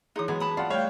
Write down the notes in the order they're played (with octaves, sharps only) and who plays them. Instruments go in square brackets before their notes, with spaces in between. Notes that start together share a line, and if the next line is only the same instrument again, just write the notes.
[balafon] E3 E4 G#4 [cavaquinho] D#4 D#6
[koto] F#3 G#3 B3 [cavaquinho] G#5
[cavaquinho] A5 B5 D#6
[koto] F4 [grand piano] D5 F#5
[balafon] G3 A3 [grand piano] C#5 [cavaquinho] F5 G5